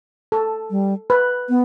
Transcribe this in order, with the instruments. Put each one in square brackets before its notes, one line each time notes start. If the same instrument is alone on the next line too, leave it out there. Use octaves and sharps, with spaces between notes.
[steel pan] A4
[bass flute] G3
[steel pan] B4
[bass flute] B3